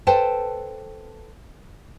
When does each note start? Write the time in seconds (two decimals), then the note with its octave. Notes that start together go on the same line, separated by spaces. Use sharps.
0.07 A4 B4 C5 G5 A5